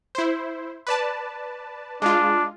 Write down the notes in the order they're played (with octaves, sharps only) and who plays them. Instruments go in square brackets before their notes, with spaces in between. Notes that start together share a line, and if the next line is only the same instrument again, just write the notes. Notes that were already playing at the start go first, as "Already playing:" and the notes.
[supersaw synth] E4 C5
B4 D5 A5
[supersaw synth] G#3 F4 [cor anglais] D4